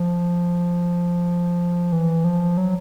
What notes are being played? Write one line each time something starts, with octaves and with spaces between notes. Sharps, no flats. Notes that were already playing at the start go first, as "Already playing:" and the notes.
Already playing: F3
E3
F3
F#3